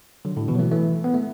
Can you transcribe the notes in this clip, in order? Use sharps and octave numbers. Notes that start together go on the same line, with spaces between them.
D3 F#3
A2 D3
B2 E3
F#3
E3 A3
E3 A3
B3
A3